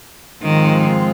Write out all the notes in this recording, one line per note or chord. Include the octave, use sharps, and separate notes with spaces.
G#2 D#3 F3 G#3 C4 F4